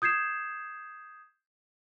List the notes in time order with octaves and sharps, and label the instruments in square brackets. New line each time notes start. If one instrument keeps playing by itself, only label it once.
[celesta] D#6 G6 G#6 C7 E7